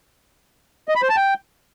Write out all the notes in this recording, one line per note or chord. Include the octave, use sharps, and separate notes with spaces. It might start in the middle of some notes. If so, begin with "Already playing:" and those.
D#5
B5
C5
A5
G5